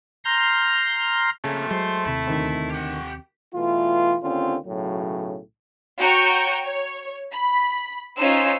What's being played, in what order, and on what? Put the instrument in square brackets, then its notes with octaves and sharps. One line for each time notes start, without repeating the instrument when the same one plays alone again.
[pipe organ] A#5 C6 F6 G6
[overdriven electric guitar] F2 A#2 [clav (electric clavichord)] C#3 G#5 [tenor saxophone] A3
[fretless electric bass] F#3 [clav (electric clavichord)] G#3 [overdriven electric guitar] C5
[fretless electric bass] D#2 C3 [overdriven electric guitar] E4
[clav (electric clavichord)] D2 D#3 C4
[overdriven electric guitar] G4 F#5
[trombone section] B2 E3 A3 F4
D#2 D3 C4 C#4 F4
B1 A2 C#3 F#3
[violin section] F#4 C#5 G5 A#5 C#6
C#5
B5
C#4 D#4 F4 C5 E6